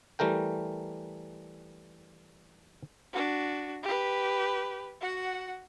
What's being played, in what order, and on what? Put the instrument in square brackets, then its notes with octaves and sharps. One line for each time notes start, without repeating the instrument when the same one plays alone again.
[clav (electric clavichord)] E3 G3 A3 A#4 G5
[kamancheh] D4 F#4
G4 B4
F#4 F#5